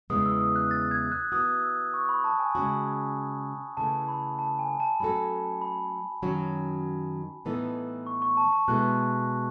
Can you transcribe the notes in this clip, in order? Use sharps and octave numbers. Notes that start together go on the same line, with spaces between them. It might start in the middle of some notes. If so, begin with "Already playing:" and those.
E2 C#3 E3 G#3 B3 D#6
E6
D#6
F#6
A6
G#6
F#6
E3 B3 F#4 D#6
E6
C#6
B5
A5
G#5
C#3 G#3 C#4 F#4
C#3 E3 A3 A5
B5
A5
G#5
A5
F#3 A3 C#4 F#4 A4 B5
B5
F#2 D#3 F#3 C#4 F#4
A2 E3 B3 D#4 A4
C#6
C#6
A5
A5
B2 G#3 B3 E4 A4 F#6